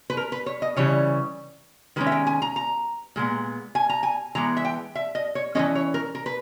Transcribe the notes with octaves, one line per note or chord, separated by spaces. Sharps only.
B4
A#4
B4
C#5
D#5
C#3 E3 G3 C#5
D#3 G#3 C#4 B4
E5
G5
G#5
A#5
A#5
A#2 G#3 B3
G#5
A#5
G#5
E3 G#3 B3 A#5
E5
G5
E5
D#5
C#5
E3 G#3 C#4 D#5
C#5
A#4
A#4
B4